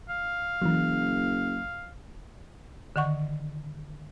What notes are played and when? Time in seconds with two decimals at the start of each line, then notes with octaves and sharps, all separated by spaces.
0.09 F5
0.62 F#1 E3 F#3
2.96 D3 D#3 F#5 C#6